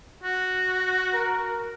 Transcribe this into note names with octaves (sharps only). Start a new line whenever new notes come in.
F#4
A#4